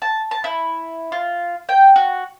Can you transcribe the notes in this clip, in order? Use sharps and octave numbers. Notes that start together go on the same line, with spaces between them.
A5
A5
E4
F4
G5
F#4